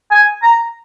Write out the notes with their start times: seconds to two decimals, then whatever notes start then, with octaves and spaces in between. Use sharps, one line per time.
0.11 G#5
0.43 A#5